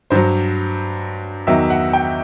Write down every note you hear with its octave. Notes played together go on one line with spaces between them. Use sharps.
G2 F#3 C5
E2 D#3 F#3 E5
F#5
G5